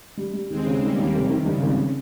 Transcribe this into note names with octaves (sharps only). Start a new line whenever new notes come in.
G3
G3
D#2 G#3 C4
C#3
D#3 G3 A#3
D#2
F1 C3
D#3
G2 C#3
G#1